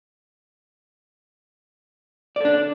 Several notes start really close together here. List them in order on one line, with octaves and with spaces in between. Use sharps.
D5 A4 D4